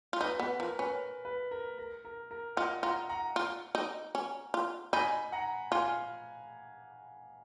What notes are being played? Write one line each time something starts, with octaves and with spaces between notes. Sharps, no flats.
F4
D#4 B4
B3 B4
F3 A#4
C#4 B4
B4
A#4
A#4
A#4
A#4
F4 D#5 F#5
F4 F#5 A#5
F#5 A#5
F4
D#4
C#4
F4
D#4 G#5 B5
F#5 A#5
F4 F5 G#5